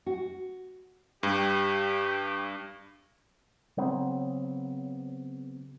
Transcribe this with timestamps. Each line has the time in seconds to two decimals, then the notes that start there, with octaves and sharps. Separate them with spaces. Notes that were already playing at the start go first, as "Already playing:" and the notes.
0.06 F#4
1.23 G2 G4
3.77 C#3 F#3 B3 C4